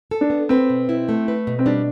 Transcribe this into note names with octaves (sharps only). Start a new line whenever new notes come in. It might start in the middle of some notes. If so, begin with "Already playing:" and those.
A4
D4
B3
C4 B4
B2
E4
A3
B4
B2
C4
G3 D4